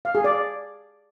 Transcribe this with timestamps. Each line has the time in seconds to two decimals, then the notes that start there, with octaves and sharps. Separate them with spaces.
0.05 F5
0.15 G#4
0.24 D5